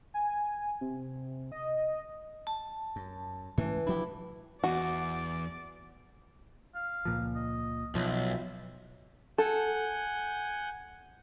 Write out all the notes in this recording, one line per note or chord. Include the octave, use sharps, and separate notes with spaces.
G#5
C3
D#5
A5
F#2
G#2 E3 A3 C#4
D2 F3 D4 E4 G4
E2 F#4 D5
F5
C#2 A#2 F3
D#5
B1 F3 E5
A4 F#5 G#5 G6